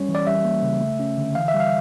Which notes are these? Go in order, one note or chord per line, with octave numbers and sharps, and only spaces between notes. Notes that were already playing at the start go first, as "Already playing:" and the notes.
Already playing: G3 C#4 C#5
E3
D5
G3 E5
A#3
C#3
A3
C#4
D3
E3 F5
E5
G3
F5